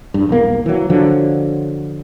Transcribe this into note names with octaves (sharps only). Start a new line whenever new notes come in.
G2
B1 E2 A#3
E3 F#3
D3 F3 F#3